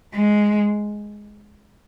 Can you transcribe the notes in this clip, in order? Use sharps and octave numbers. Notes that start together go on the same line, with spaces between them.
G#3